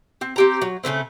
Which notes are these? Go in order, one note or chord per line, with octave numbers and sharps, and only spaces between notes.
C4
C4 G4 A#5
F#3
C#3 F#3 A3 C4